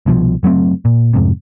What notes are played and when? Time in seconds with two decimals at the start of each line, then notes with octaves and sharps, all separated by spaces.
0.06 C2 B2 D#3 F3
0.43 F#1 F#3 A3 C4
0.85 A#2
1.13 F2 G#2 C3